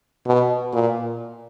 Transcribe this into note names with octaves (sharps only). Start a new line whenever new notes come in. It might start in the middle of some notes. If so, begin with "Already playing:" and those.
B2
A#2